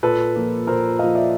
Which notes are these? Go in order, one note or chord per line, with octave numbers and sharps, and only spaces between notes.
A#2 A4 B4
F3 A#3
A#2 A#4 C5
F3 A#3 D#5 F5
D5 E5